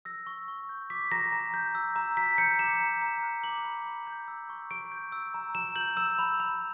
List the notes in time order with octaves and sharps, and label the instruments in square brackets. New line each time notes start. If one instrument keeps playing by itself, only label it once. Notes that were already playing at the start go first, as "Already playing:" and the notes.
[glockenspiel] E6 A#6
C#6
C#6
G6
D6 B6
A#5 A#6
A#5
G6
E6
A#5
A#5 B6
G6 C#7
D6 E7
A#5
A#5
F#6
D6 F#7
B5
B5
G6
E6
C#6
C#6 D7
G6
E6
A#5
A#5 E7
G6 F#7
E6 E7
B5
B5